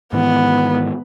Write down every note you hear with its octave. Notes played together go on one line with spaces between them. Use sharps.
G#2 D#3 E3 B3